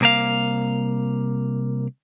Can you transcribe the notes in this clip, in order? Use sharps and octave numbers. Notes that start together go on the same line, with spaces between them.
C2 A#3 F5